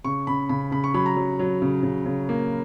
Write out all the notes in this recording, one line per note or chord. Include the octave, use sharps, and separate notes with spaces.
C#3 C#6
C#3 B5
C#3 B5
C#3 B5
C#6
F#3 B5
A#5
F#3
F#3
C#3
C#3
C#3
A#3